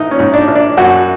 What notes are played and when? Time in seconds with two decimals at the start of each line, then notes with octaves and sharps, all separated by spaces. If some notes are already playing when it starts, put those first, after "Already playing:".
Already playing: A1 D#4
0.11 C#4
0.19 G#2
0.34 D4
0.48 A1
0.55 D4
0.77 F#2 F#4